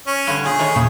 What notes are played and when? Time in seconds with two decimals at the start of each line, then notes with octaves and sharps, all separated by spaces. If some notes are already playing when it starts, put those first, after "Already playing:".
0.07 C#4
0.27 G2 D3
0.46 A#2 G#4
0.59 D#3 A3 C#5
0.76 E2 A#2 C#3